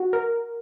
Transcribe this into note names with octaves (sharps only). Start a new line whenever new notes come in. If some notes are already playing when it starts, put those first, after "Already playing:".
Already playing: F#4
A#4